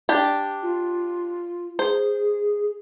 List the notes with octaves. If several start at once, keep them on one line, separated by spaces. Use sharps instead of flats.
D4 G4
F4
G#4 C5